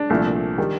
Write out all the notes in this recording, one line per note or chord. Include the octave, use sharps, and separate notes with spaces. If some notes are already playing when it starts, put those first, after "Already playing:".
Already playing: D4
C2 A#2 F3 A3
D#3 G3